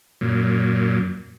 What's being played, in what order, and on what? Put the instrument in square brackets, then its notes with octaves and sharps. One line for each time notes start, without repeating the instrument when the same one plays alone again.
[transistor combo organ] F#2 A#2